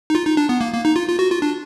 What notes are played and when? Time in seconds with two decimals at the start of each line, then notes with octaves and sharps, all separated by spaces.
0.10 D#4
0.15 F4
0.27 D#4
0.37 D4
0.49 B3
0.61 A#3
0.73 A#3
0.85 D#4
0.96 F4
1.08 F4
1.19 F#4
1.30 F4
1.42 D4